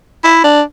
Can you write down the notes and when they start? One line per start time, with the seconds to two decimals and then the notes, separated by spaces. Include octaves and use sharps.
0.24 E4
0.44 D4